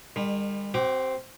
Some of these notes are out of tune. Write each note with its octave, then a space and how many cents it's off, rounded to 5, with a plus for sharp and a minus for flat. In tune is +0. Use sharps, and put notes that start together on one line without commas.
D#3 -35 G3 +40
C4 +0 F#4 +40 D6 +0